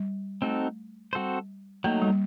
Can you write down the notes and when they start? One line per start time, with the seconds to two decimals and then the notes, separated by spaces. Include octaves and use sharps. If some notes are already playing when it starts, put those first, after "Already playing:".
Already playing: G3
0.42 A3 C4 D#4 F#4 A4
1.13 G3 C4 F#4 A4 C5
1.84 F#3 A3 A#3 D#4
2.02 G3